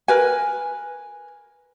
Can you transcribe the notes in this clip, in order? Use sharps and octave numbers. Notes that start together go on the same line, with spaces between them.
A#4 B4 G#5